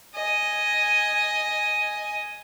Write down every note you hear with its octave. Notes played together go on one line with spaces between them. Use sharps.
D#5 G#5